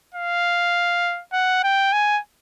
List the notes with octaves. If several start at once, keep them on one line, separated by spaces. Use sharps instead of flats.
F5
F#5
G5
G#5